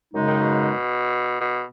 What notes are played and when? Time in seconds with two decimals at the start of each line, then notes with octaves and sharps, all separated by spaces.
0.14 F#2 C#3 G#3 D#4
0.27 D#3
0.41 B2
1.41 B2